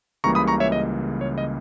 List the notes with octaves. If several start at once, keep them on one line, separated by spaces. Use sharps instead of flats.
C#2 C#3 E3 G3 A#3 A#5 C#6
B5 D#6
A#5 C#6
C#5 E5
D#5
C#5
D#5